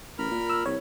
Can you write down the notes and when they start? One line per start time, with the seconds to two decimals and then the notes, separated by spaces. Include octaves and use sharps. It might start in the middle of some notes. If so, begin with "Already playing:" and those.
0.18 A1 A#4 B5 F6
0.31 A#2
0.50 E6
0.66 C2 C#5